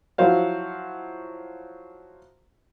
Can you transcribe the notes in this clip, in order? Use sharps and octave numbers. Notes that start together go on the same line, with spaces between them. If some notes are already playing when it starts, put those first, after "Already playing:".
F3 F#3 E4 F#4 C5 F5